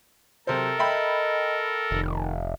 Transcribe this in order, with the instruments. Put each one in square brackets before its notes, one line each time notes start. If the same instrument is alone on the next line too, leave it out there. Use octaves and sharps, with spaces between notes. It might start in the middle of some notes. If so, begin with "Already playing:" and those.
[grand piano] C3 C5 [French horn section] F#3 [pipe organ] A4 A#4
[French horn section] D#5 [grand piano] E5 G5 B5
[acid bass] F1 [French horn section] D#3